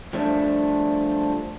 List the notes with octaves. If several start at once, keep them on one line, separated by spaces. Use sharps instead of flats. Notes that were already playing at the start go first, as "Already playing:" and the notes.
F3 G3 A3 D4